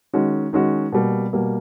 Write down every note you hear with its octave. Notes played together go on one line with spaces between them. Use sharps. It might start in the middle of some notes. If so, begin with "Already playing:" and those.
D#3 G#3 C#4 F#4
D#3 G#3 C#4 F#4
B2 G3 A#3
B2 G3 A#3